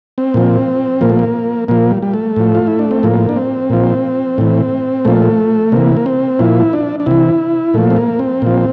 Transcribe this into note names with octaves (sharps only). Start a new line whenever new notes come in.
C4
A#2 F3
A#2 F3 A#3
A3
A#3
A#2 F3 A#3
G3
G3
A3
A2 F3
F4
E4
D4
C4
A2 F3 A#3
D4
C4
A#2 F3
A2 E3
A#2 F3 A3
C3 E3 A#3
A#3
C4
A#2 F3 E4
D4
D4
C3 E3 E4
A#2 F3 A3
C4
A#3
C4
A#2 F3